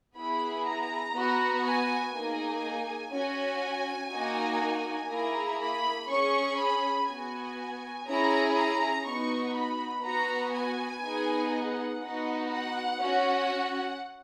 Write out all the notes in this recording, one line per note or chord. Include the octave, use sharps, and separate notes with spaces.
B3 E4 G#4 B5
A#5
B3 F#4
G#5
A#3 D#4 G#4 G#5
C#4 F#4 G#5
A#3 D#4 F#4
A#3 E4 G#4 A#5
B5
C#4 G#4 C#6
B5
B3 F#4 G#5
C#4 E4 G#4 A#5
A#5
B3 D#4 F#4 C#6
B5
B3 F#4 A#5
G#5
B3 D#4 G#4
F#5
B3 D#4 F#4
F#5
C#4 F#4